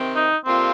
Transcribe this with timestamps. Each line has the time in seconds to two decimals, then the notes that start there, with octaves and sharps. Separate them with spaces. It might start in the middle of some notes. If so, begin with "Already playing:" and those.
Already playing: C3 D#3 C4
0.15 D#4
0.45 F2 C3 G3 A#3 C4 F4